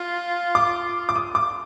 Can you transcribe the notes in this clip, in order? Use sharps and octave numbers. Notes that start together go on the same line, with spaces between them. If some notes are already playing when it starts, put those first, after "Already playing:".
Already playing: F4
D6
D6
D#6
D6